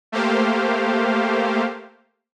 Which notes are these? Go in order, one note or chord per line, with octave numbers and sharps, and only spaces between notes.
A3 A#3 G4 C5 F5